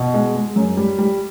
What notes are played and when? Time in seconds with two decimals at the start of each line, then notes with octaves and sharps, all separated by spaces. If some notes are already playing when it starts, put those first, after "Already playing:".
Already playing: B2
0.14 G#3
0.35 G#3
0.56 F#2
0.77 G3
0.98 G3